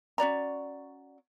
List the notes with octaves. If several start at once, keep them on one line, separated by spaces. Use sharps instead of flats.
C#4 F#4 D5 A#5